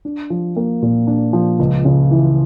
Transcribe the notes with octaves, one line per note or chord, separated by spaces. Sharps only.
D4
F3
A#3
A#2
D4
F3
C#2
C#3
E3